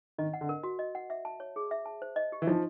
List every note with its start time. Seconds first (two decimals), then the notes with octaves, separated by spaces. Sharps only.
0.18 D#3 D#5
0.34 F#5
0.41 D3
0.49 A#4
0.63 F#4
0.79 D#5
0.95 F#5
1.10 E5
1.25 A5
1.40 C#5
1.56 G#4
1.71 E5
1.86 A5
2.02 C5
2.16 D#5
2.32 G4
2.42 E3
2.47 F3 D#4